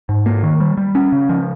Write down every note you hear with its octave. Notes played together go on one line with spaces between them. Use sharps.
G#2
A#3
D#3
G3
G3
C#4
C#3
F3